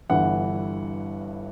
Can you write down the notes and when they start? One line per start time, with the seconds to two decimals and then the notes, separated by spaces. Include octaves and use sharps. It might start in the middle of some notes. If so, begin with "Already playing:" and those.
0.10 G1 G2 E3 F#5